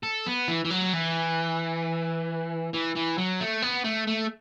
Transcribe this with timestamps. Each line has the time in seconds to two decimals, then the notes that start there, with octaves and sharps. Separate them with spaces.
0.03 A4
0.27 B3
0.48 E3
0.65 E3
0.70 F#3
0.93 E3
2.73 E3
2.95 E3
3.18 F#3
3.40 A3
3.62 B3
3.84 A3
4.07 A3